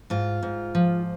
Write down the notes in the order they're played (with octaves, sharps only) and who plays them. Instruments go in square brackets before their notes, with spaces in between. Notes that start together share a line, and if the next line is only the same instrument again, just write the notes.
[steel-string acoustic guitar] G#2 F4
G#2
F3